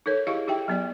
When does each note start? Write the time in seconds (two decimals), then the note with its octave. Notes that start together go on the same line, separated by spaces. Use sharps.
0.06 D#4 A4 A#4 C#5
0.27 E4 G4 G#4 D#5 F5 C#6
0.47 D#4 G4 E5 G5
0.68 F#3 B3 D5